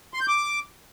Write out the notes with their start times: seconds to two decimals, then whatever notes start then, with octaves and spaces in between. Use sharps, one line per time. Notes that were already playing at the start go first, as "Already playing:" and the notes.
0.14 C6
0.21 G6
0.28 D6